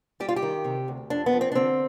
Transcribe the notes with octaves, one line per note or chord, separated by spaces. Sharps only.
G3 G4
F4
G4
D#3
C3
D2
F2 D4
B3
F3
C4
D4
D3 C4